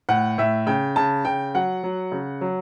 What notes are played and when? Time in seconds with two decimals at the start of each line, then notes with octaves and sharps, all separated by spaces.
0.09 A2 F#5
0.38 A2 E5
0.67 C#3 G5
0.96 C#3 A5
1.25 C#3 G5
1.55 F#3 F#5
1.83 F#3
2.12 C#3
2.41 F#3